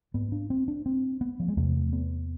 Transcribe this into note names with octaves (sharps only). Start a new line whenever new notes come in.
G#2 B3
D4
C4
D4
C4
B3
F3
G#3
E2 C3 A3
B3